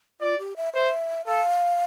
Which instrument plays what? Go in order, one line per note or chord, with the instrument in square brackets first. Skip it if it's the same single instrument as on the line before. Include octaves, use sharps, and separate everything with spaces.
[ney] F4 [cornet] D5
[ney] G4
E5
[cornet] C5 [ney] E5
[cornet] A4 [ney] F5